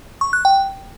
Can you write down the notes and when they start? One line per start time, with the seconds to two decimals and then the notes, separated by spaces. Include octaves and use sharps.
0.21 C#6
0.33 F#6
0.45 G5